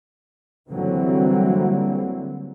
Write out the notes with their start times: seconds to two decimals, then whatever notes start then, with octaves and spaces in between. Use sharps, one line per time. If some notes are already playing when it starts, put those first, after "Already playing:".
0.71 D3 E3 F#3 G3 A#3 C4